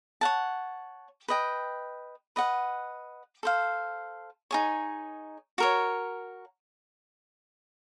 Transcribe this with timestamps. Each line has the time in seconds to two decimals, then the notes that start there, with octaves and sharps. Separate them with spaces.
0.21 C#5 F#5 A5
1.28 B4 D#5 G5
2.36 B4 D#5 F#5
3.43 A4 C5 F5
4.51 D#4 G#4 C#5
5.58 F#4 A#4 C#5